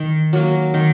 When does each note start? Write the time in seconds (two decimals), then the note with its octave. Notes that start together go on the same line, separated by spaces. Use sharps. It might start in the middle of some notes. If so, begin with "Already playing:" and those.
Already playing: D#3
0.33 F#3 A#3
0.74 D#3